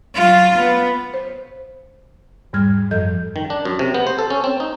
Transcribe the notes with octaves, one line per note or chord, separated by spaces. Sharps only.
F#3 F4
B3
C5
E2 G#2 G3 F6 G#6
F#2 F3 A4 D#5 G6
D#3
D4
F#2
C3
B3
C5
A4
C#4
C4
D#4